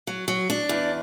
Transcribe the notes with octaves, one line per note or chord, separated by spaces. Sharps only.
F#3
F#3
D4
E2